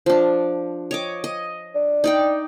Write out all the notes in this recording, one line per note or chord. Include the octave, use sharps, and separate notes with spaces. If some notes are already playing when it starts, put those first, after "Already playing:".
F3 D4
C#5 D#5 D6
D#5
D4
D#4 D5 G5